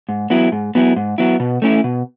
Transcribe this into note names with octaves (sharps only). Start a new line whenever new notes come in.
G#2
F#3 B3 E4
G#2
F#3 B3 E4
G#2
F#3 B3 E4
B2
A3 C#4 E4
B2